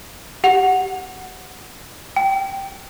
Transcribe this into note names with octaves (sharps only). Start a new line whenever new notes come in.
G4 F#5 F7
G5